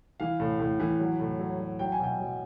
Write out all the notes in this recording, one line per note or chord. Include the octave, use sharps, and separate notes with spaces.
E3 F5
A2
A2
E3
F#3
A2
F#3
F#3
F#3 G5
G#5
B2 G5
F#3